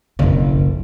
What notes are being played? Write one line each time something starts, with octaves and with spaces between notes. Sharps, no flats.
F#1 B1 F2